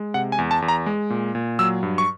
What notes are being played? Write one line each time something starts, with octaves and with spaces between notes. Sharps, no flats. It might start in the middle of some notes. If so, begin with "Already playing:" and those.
Already playing: G#3
C3 F#5
G#5
E2
A5
E2
A#5
G#3
A#2
A#2
F#3 E6
G2
C#6